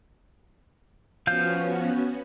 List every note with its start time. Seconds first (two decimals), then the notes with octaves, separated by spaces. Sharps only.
1.27 F3 B3 C#4 F#4 F5 G6